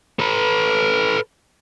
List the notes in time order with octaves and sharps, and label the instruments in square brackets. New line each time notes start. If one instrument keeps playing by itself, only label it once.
[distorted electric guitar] A4 B4